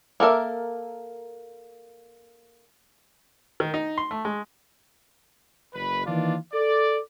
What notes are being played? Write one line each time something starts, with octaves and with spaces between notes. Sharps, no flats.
A#3 A4 A#4 E5
D#3
D#4
C6
A3
G#3
F#1 B4
D#3 E3 A#3 D4 F4 D5
A4 D5